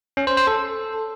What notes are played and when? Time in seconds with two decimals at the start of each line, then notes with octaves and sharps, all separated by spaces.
0.17 C#4
0.27 C5
0.37 C5
0.47 A4